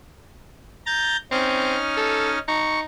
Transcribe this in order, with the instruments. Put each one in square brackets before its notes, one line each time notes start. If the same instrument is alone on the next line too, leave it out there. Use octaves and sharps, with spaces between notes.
[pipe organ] A#5 G6 A6
[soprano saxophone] C4 [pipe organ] C#4 D#4 F6
[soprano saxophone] A4
[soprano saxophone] D#4 [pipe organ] C#6